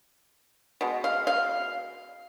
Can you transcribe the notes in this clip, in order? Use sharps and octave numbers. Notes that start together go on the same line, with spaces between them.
B2 G#3
F5
F5